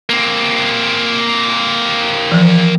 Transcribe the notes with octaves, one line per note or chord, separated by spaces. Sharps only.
A#3 C4
E3 F3